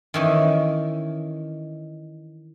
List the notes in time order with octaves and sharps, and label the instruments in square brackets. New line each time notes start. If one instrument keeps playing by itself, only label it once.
[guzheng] D#3 E3 C#4